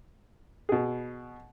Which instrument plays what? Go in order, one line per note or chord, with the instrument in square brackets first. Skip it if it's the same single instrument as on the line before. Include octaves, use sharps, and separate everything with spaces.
[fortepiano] B2 G#4